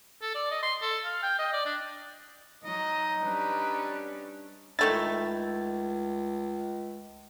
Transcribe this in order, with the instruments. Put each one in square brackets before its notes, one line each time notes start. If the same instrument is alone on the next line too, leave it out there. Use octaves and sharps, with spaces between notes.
[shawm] A4
D5
D#5
C6
A4
F5
G5
D#5
D5
D4
[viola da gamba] F#3 [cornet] D#4 [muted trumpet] D#5
[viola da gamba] G3 C#4 D4 [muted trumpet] B4
[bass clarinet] C#2 [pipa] D#3 A3 E4 [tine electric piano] A6